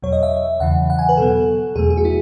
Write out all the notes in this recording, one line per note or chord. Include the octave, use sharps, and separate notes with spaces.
E2 B2 F#3 C#5
D#5
E5
E2 C#3 E3 F#5
F#5
G#5
B4
B2 F#3 B3 A4
E2 B2 A3 G#4
G#4
F#4
E4